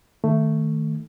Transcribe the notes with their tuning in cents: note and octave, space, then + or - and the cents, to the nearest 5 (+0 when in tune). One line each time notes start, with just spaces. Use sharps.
D#3 +0 A3 +10